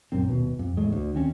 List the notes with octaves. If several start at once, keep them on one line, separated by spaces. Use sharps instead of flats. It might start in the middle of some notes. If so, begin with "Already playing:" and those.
A#1 F#2 C4
D#1 B2
F2
E2 A2 G#3
D2
D#2 C4 C#4